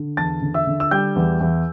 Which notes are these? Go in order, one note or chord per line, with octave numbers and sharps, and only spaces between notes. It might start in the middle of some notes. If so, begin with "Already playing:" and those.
Already playing: D3
E2 A5 A6
D3
E5 E6
D3
E6
G3 G5 G6
E2
E2